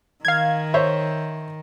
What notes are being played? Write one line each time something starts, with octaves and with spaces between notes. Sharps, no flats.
D#3 F5 G#6
C5 C#5 E5